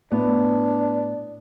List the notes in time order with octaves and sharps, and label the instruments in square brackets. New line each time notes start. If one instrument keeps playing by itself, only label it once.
[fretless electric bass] A2 [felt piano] B3 [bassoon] D4